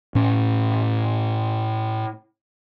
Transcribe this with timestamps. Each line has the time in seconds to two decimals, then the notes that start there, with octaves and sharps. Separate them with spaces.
0.15 A2 C#4